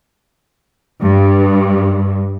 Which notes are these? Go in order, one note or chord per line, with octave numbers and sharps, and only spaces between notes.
G2